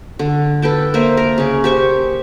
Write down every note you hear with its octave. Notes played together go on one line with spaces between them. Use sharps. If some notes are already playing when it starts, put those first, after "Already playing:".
D3
A4 B4 G5 A5
A#3 C5 E5
A#4
C#3 C#4
G4 C5 C#6